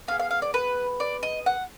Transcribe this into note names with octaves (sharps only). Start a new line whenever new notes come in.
B3 F4 G#4 F5
F5
F5
D5
B4
D5
D#5
F#5